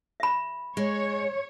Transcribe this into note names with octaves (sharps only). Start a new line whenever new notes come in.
E5 B5
G#3 C#5